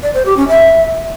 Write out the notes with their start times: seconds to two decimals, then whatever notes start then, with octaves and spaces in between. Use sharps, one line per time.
0.03 D5
0.14 C5
0.25 G4
0.37 C#4
0.48 E5